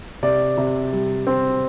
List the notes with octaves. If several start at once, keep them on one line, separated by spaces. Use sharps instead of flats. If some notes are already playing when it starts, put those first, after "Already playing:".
C3 D5
C3
G3
C4